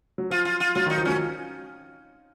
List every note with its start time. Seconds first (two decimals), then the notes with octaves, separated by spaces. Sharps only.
0.18 F#3
0.30 F3 F4
0.45 F4
0.60 F4
0.75 F#3 F4
0.86 D#3 D#4
0.98 F3
1.05 F#3 C#4